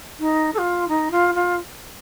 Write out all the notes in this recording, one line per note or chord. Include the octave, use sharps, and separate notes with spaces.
D#4
A4
F4
D#4
F4
F4